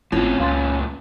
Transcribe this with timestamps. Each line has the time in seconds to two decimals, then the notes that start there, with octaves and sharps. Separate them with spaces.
0.12 G#1 A2 A#3 C4 C#4 E4 F4
0.40 C#2 G2 A#2 F5 C6 A6